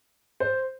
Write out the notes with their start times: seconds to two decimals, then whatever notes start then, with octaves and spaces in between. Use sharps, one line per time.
0.40 C5